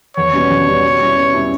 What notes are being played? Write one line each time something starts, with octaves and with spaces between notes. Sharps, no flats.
E2 C#5
B2 G3 C#4
E2
B2 G3 C#4
B2
G3 C#4 E4
B2
G3 C#4 E4